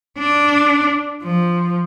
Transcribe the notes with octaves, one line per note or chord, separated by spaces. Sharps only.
D4
F3